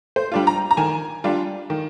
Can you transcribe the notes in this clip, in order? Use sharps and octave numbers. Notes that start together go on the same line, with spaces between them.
C5
G3 D4 F4
A#5
A#5
D#3 G#5
G3 D4 F4
D#3